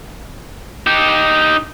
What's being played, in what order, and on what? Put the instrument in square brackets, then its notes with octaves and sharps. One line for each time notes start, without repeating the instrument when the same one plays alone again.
[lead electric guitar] D#4 G4